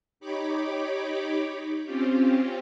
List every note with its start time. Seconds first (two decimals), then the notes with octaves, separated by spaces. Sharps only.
0.20 D#4 G4 C#5 B5 D6
1.85 C4 C#4 F4 G4